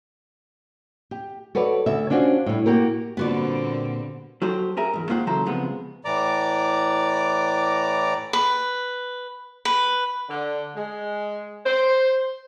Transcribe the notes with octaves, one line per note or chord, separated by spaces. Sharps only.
G4
F#4 A4 B4 C#5 D5
D2 E5
C#4 D4 F4 F#4 C5
A2 G3
A#3 F#4 G4 A#4
A#2 D3 G3 B3 C4 F#4 D5
F#3 F#4 G4 A4 C5
G4 G#4 A#4 E5
E2 G#2
G#3 A#3 F4 G4 C5 F#5
C#3 E3 F#3 A4 C5 A#5
C#2 C3 F3 G#3 B3 F#5
A2 E3 D5 A#5 D6
B4
B4
D3
G#3
C5